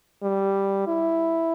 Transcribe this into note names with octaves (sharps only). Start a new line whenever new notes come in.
G3
E4